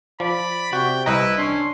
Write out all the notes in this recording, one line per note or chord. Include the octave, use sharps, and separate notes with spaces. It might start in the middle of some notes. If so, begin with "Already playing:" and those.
F3 D5 B5
C3 F#4 G5
C2 E4 B4 D#5 A#5
C#4 D4 C6